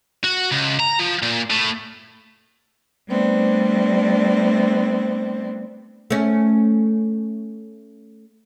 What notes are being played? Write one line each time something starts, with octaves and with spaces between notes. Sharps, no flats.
F#4
C#2
A#5
F3
A#2
A2
G3 A3 B3 C4 D4
A3 C#4